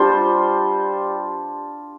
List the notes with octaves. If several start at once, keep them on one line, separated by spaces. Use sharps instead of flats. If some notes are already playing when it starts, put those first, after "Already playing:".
Already playing: G3 D4 F4 C5